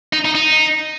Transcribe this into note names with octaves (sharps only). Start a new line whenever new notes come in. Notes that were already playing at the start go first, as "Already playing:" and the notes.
D#4
D#4
D#4